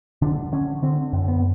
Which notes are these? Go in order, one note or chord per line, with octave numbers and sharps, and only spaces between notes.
D3 D4
D3 C#4
D3 C4
F#2
B3